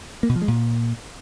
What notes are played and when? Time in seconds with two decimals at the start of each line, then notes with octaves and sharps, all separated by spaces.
0.23 A#3
0.29 B2
0.35 F3
0.42 G#3
0.48 A#2